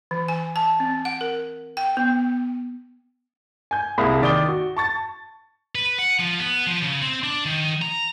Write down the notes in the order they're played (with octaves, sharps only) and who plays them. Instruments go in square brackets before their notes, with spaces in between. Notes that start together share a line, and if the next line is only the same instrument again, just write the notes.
[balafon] E3
G#5
A5
C4
F#5
A#4
G5
B3
[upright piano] G#5 G6
C2 A#3 E4 G#4 B5
D#3 D5 D#6 G7
F#4
A5 C#6 A6
[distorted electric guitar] B4
F#5
F3
B3
F3
C#3
C4
D4
D#3
A#5